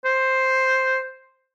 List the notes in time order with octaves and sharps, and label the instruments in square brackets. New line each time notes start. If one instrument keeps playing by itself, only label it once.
[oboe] C5